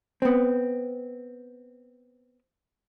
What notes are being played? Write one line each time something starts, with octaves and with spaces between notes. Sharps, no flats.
B3 C4